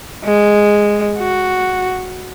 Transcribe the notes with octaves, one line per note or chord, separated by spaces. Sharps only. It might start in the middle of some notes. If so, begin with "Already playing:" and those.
G#3
F#4